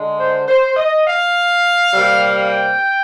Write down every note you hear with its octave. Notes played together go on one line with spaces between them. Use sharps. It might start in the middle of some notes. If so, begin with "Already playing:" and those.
Already playing: D3 G#3
C5
C5
D#5
F5
C3 G3 A#3
G5